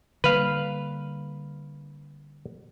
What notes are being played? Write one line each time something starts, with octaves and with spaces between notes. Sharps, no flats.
D3 G3 A#3 B4 F5